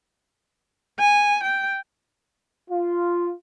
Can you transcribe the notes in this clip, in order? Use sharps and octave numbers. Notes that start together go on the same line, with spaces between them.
G#5
G5
F4